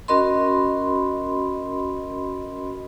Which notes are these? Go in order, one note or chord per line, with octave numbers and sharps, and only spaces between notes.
C#4 F#4 A#4 D#5 B5 C6